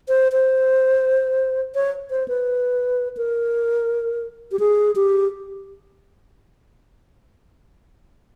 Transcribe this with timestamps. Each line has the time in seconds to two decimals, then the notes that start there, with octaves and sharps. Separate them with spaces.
0.08 C5
0.32 C5
1.75 C#5
2.10 C5
2.28 B4
3.17 A#4
4.52 G4
4.59 G#4
4.96 G4